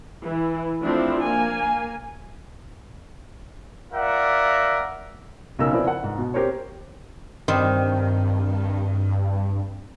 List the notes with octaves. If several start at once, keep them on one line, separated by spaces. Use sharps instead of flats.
E3 E4
F3 A3 C4 D4 E4
A#3 G#5
F4 A#4 D5 E5 F#5
B1 C#3 D#4 A#4 E6
F3 B3 C4 E4 A#4 D5
A#4 F#5
G#2
B2
C4 G4 A#4 C5 C#5
G2 D#3 G3 C4